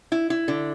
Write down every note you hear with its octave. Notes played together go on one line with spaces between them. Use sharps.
E4
E4
D3